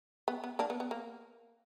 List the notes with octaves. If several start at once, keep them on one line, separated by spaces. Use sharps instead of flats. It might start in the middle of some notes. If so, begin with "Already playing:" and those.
B3
B3
A#3 D4
B3
B3
A#3